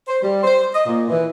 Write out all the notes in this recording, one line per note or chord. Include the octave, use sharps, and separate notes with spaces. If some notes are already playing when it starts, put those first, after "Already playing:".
C5
G3
C5
D#5
A#2
E3